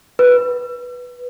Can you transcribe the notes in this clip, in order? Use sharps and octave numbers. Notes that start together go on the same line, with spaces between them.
B4